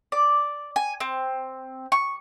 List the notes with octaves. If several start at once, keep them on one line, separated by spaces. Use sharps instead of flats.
D5
G#5
C4
C#6